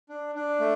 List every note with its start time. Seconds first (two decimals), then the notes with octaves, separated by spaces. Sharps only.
0.09 D4
0.35 D4
0.60 A3